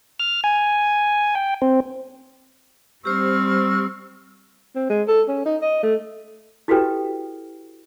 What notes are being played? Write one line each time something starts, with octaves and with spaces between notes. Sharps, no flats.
F6
G#5
G5
C4
G3 C4 G4 C5 C#6 E6 F6
C4
G#3
A4
C#4
D#4
D#5
A3
E4 F#4 G4 A4 B4 G5